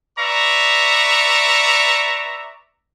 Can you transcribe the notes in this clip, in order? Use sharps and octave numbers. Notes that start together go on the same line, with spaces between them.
B4 D5 E5 A#5 C#6